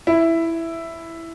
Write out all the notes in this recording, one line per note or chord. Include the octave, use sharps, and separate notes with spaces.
E4